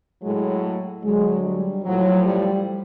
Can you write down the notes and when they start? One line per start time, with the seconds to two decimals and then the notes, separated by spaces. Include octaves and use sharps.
0.22 A2 F#3 G#3
1.03 D2 D3 F#3 G#3
1.44 G3
1.84 A2 F3 F#3
2.25 G3